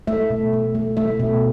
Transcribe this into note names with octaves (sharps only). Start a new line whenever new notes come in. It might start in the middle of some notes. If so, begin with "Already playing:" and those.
A3 E5
B2
A3
A3
A3 E5
B2